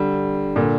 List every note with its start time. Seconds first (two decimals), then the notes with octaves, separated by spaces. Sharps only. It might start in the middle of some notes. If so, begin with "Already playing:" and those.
Already playing: D3 G3
0.56 A#2 D3